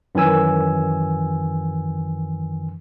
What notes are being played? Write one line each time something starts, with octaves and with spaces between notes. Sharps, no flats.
F#2 D#3 E3 G#5 E6